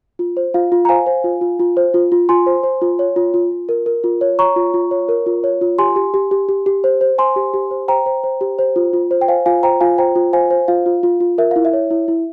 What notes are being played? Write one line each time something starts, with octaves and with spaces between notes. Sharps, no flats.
F4
C5
F4 F5
F4
A#5
C5 F5 G#5
C5
F4
F4
F4
C5
F4
F4
F4 G#5 C6
C5
C5
F4
C#5
F4
F4
F4
A#4
A#4
F4
C#5
C#5 A#5 C#6
F4
F4
C#5
A#4
F4
C#5
F4
G4 G#5 C6
G4
G4
G4
G4
G4
C5
C5
C5 G#5 C6
G4
G4
C5
C5 G5 A#5
C5
C5
G4
C5
F4
F4
C5
G5
C5 F5 G#5
F4 F5 G#5
C5 G5 A#5
F4 F5 G#5
C5 G5 A#5
F4
C5 F5 G#5
C5
F4 F5
F4
F4
F4
A#4 E5
E4 F5
E5
C#5
E4
E4